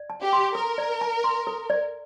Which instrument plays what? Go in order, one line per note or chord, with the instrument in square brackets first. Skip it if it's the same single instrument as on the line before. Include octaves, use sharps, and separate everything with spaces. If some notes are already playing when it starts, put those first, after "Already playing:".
Already playing: [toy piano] D5
A5
[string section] G4
[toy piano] C6
[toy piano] A4 [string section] A#4
[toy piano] D5
A5
C6
A4
D5